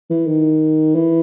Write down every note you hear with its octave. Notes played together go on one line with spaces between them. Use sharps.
E3
D#3
E3